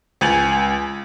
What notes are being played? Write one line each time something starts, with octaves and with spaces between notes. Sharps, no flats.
C#2 G#5 A6 F#7